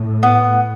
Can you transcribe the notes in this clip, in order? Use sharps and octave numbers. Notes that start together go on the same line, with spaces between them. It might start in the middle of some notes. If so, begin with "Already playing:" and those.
Already playing: A2
B3